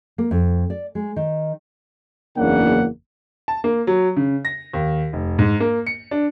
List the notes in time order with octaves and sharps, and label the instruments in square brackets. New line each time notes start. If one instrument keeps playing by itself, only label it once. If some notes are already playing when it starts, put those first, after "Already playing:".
[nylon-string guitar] A#3
F2
D5
G#3
D#3
[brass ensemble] F#1 E2 C#3 A#3 D4 F#5
[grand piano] A5
A#3
F#3
C#3
A#6
D#2
F1
G#2
A#3
C#7
D4